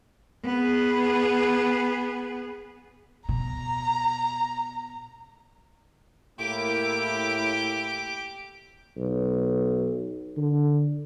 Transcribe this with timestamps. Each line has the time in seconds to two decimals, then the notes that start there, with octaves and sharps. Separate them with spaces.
0.44 B3 G#4
3.29 B2 A#5
6.39 A2 A#3 E4 G4 D6
8.97 B1
10.37 D3